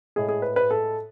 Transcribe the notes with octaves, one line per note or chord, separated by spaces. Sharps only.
A2 G#3 G#4
G#4
B4
B4
A4